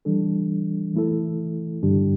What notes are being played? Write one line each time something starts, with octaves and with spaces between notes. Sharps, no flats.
E3 G3 D4 A4
E3 A3 E4 A4
G2 D3 G3 D4 G4